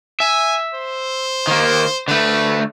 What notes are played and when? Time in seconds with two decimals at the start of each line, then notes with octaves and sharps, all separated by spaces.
0.20 E5 G#5
0.74 C5
1.47 D#3 A#3
2.08 D3 A3 B4